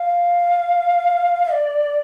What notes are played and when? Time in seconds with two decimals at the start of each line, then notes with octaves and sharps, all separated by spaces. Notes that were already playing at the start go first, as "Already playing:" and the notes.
Already playing: F5
1.53 D5